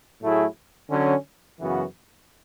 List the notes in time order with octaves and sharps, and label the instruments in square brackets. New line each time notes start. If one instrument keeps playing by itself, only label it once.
[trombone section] A2 F#3 A3 E4 G#4
D3 F#3 C#4
F#2 C#3 E3 B3 F#4